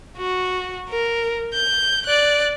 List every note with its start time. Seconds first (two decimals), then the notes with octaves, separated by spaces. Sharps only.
0.17 F#4
0.89 A#4
1.53 G6
2.06 D5 F#6